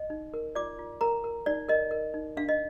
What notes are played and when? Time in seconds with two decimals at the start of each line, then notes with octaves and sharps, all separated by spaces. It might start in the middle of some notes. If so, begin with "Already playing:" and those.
Already playing: D#5
0.10 D#4
0.34 A#4
0.55 F4 D5 D6
0.79 F4
1.01 A#4 A#5
1.24 A#4
1.46 D#4 D5
1.69 A#4 D#5
1.91 A#4
2.14 D#4
2.37 D4 F5
2.49 D#5